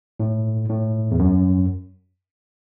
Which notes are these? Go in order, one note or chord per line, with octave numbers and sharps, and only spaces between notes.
A2
A2
E2
F#2